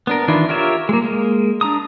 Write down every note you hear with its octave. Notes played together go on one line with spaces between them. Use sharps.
B3 D4 A#4
D#3 E3 D4 E4 F4
F4 G4 A#4 C#5 E5
G#3 A#3
G#3 A#3
D4 A#5 D#6